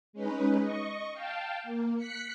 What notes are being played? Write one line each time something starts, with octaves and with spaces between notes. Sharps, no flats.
G#3 C#4 D#4 B4
D#5 C#6
F5 G5 A5
A#3
F#6 B6 C#7